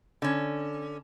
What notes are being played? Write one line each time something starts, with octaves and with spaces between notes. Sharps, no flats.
D3 C#4